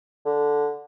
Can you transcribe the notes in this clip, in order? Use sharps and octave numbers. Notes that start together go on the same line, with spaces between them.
D3